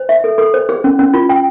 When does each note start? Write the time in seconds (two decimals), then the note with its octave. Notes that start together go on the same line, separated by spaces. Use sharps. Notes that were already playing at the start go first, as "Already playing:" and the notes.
Already playing: C5
0.09 E5
0.24 A4
0.38 A4
0.54 C5
0.69 G#4
0.84 C#4
0.99 C#4
1.14 F4
1.29 G5